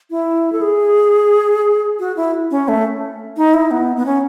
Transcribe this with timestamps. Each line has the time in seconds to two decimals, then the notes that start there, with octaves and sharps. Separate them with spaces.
0.10 E4
0.52 A4
0.61 G#4
1.99 F#4
2.16 E4
2.51 C#4
2.68 A3
3.37 D#4
3.54 E4
3.71 B3
3.96 B3
4.06 C#4